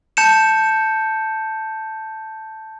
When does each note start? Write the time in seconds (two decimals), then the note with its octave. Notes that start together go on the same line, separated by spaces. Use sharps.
0.17 A5 G6 C#7 E7